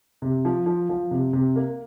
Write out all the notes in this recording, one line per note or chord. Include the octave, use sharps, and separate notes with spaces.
C3
F3
F3
F3
C3
C3
A#3